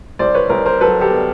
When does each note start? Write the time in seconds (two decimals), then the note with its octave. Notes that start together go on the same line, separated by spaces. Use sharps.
0.19 C2 C5 D5
0.34 B4 C#5
0.50 C2 A#4 C5
0.66 A#4 C5
0.81 F#3 A4 B4
1.01 G4 A4
1.11 B3